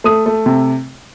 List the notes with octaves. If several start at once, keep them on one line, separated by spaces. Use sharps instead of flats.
A3 D#6
A3
C3